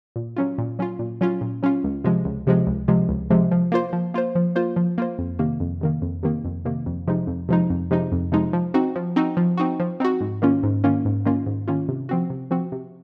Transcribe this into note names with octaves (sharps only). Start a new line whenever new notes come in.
A#2
F#3 C#4 F4
A#2
F#3 C#4 F4
A#2
F#3 C#4 F4
A#2
F#3 C#4 F4
C#2
C3 F3 G#3
C#2
C3 F3 G#3
C#2
C3 F3 G#3
C#2
C3 F3 G#3
F3
A#3 F4 C5
F3
A#3 F4 C5
F3
A#3 F4 C5
F3
A#3 F4 C5
F2
C3 D#3 A#3
F2
C3 D#3 A#3
F2
C3 D#3 A#3
F2
C3 D#3 A#3
F2
C3 F3 G#3 D#4
F2
C3 F3 G#3 D#4
F2
C3 F3 G#3 D#4
F2
C3 F3 G#3 D#4
F3
C4 D#4 F#4
F3
C4 D#4 F#4
F3
C4 D#4 F#4
F3
C4 D#4 F#4
G#2
D#3 A#3 C#4 F4
G#2
D#3 A#3 C#4 F4
G#2
D#3 A#3 C#4 F4
G#2
D#3 A#3 C#4 F4
C3
F3 C4 F#4
C3
F3 C4 F#4
C3